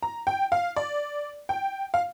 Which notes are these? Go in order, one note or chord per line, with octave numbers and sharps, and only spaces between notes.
A#5
G5
F5
D5
G5
F5